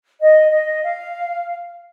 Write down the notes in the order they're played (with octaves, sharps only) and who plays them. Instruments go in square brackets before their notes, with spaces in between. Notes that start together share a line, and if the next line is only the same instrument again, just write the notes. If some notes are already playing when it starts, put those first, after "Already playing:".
[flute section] D#5
D#5
F5